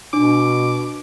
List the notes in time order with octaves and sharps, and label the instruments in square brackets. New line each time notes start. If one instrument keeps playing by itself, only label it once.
[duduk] B2 [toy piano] D4 [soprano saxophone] D6